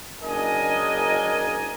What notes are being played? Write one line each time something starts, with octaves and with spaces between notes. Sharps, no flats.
F#1 D4 A#4 D#5 G#5